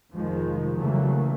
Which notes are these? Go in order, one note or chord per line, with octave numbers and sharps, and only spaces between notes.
F1 D#3 F3 G#3
C#3 E3 F#3 G3 A3 A#3